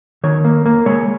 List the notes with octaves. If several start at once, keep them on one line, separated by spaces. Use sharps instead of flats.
D#3 C#5
A#3
A#3
G#3 C#5